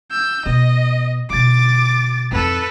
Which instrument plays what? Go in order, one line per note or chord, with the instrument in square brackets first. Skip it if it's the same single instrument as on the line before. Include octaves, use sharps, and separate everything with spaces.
[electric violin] E6 G6
[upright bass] B2 [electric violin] D#5
[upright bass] B2 D3 [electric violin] D6 A6
[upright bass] F2 G#2 [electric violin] A4 B4